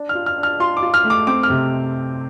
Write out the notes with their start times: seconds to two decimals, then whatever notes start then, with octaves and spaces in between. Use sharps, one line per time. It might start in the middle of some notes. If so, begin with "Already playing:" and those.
Already playing: D4
0.09 F6
0.15 F4
0.26 F6
0.38 D4
0.43 F6
0.60 F4 C6
0.77 D6
0.82 F4
0.94 F6
1.04 A3
1.10 D6
1.27 C4 D6
1.43 F6
1.50 C3